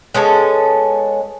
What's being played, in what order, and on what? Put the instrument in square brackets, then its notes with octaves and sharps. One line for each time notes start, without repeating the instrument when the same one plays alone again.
[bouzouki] G#3 B3 C#4 A4